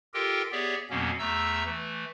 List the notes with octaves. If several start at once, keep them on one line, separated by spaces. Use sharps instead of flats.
F4 G4 A4 A#4 D#5 G5
B3 G4 G#4 C#5 D5 E5
F2 B2 F#3 A#3 B3 C#4
E2 A3 E5 A#5 E6
E3 A3